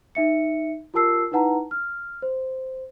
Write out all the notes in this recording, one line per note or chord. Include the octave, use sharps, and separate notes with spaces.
D#4 E5 C#7
F4 G4 A#4 A5 E6 C7
D#4 E4 B4 F#5 A5 A#5
F6
C5